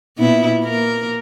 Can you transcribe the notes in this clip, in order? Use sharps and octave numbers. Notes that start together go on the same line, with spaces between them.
A#2 B3 E4
A#3 A#4